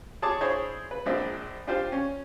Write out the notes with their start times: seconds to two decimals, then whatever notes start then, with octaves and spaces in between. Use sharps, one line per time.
0.22 G#4 C#5 A5 C#6 D6
0.41 D4 E4 G#4 C5 C#5 B5
0.91 B4
1.06 A#1 G#3 C4 D4 E5
1.67 D4 F4 G4 C5 F5
1.92 C#4